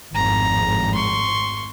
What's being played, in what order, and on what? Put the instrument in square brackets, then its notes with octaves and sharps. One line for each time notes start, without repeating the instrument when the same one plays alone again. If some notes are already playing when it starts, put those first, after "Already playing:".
[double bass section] G#1 F2 A2 [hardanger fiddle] A#5
[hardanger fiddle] C6 C#6